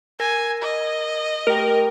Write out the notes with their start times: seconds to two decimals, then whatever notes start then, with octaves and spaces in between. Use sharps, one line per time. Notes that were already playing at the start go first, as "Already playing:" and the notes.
0.20 A#4 G#5 A#6
0.62 D#5
1.47 A3 G4 A#4 G5